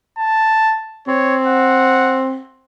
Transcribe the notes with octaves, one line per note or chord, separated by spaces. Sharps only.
A5
C4 C#5
F#5